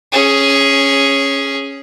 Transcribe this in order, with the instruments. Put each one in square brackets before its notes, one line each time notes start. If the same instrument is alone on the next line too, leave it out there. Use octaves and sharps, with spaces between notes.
[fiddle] C#4 G#4